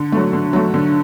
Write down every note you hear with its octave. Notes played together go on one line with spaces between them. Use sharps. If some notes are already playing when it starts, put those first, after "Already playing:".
Already playing: D3
F#3 A3
D3
F#3 A3
D3